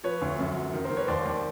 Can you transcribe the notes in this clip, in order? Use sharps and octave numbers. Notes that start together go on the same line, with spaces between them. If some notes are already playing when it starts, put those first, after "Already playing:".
F3 B4 C#5
D2
F#2
F#3
D#3
A#4 C5
D#3
B4 C#5
D#2 C5 D5
D#2